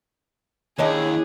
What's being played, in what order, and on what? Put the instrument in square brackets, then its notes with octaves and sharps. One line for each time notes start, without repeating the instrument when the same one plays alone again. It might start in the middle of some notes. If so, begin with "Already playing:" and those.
[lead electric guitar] D#2 [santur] C#4 D4 [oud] E4 C#5 D#5 [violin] G#4